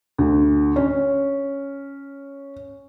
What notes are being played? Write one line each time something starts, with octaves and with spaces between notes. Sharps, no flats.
D2
C#4